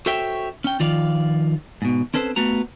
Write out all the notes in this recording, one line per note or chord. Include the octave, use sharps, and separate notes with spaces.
F#4 A4 C5 C#5 E5 G5
C#4 G5
D#3 F3 F4 D5 F5
G#2 B2
C4 C#4 A4 B4 C5
A3 B3 F#4 A#5